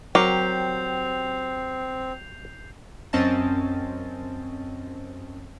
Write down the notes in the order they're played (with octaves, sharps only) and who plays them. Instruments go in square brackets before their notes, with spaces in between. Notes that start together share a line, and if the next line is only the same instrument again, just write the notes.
[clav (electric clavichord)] F#3 F#4 A#4 [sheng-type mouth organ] C4 [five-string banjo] G4 [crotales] G6 C7 F7
[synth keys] F#2 C4 C#4 D#5 A5 A6